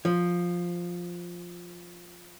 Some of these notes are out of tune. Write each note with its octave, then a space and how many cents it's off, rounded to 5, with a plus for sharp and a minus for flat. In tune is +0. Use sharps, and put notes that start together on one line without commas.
F3 +5